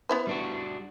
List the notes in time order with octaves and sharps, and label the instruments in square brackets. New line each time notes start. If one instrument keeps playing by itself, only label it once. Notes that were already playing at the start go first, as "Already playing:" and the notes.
[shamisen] B3 E4 C5
[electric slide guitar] G3 D4 F#4